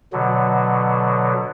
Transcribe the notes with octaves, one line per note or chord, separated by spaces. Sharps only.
B2 D3 F#3